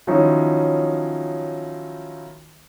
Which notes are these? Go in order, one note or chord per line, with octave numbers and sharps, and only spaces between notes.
D#3 F3 F#3 C#4 D#4 E4